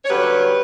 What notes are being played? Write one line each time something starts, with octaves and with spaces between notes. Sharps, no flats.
C#5
G2 D3 F#3 C#4 G4 B4